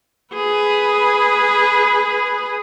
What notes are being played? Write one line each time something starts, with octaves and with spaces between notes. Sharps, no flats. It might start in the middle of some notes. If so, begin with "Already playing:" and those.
G#4 B4